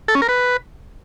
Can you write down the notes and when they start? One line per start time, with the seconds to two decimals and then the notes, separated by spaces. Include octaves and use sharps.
0.08 A4
0.15 C#4
0.22 A#4
0.29 B4